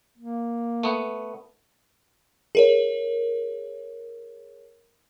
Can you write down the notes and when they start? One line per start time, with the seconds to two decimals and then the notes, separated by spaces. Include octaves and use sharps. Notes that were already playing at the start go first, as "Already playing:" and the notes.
0.18 A#3
0.83 A3 B3
2.55 G#4 A#4 C#5